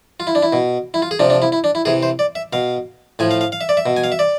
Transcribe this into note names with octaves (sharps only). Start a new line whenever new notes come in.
F4
E4
D4
E4
B2
E4
F4
G#4
C3 F3 D4
D4
E4
E4
D4
E4
C3 E3 G#4
C5
D5
E5
B2 F5
A2 F3 G#5
F5
F5
F5
E5
D5
E5
B2
G#5
F5
E5
D5